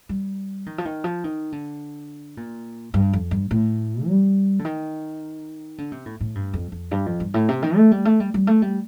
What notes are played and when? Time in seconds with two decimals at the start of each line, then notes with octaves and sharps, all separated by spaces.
0.09 G3
0.66 D#3
0.78 F3
0.85 D#3
1.04 F3
1.24 D#3
1.52 D3
2.37 A#2
2.94 G2
3.13 F2
3.31 G2
3.51 A2
4.07 G3
4.59 D3
4.65 D#3
5.78 D3
5.92 C3
6.06 A2
6.21 A2
6.35 G2
6.54 F2
6.72 F2
6.91 G2
7.06 F2
7.20 G2
7.34 A2
7.49 C3
7.62 D#3
7.77 A3
7.92 G3
8.05 A3
8.20 G3
8.34 G3
8.47 A3
8.62 G3